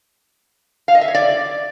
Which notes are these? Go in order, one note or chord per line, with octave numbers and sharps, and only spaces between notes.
F5
D#5
E5
C#5
D5